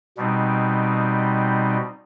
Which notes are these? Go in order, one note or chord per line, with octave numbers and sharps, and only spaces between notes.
B2 G3 C4 D#4